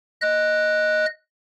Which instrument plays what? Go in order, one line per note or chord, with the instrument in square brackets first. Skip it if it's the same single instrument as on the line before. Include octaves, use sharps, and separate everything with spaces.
[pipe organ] D#5 F#6